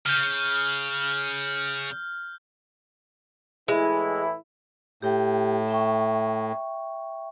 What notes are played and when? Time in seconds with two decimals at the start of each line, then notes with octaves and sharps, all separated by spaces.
0.06 C#3 F6 G6
3.68 A2 E3 G#3 E4
5.02 A2 G4 G5
5.68 E5 G5 C#6